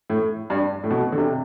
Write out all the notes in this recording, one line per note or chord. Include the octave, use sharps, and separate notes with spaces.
A2
G2
A2
B2
D3
C3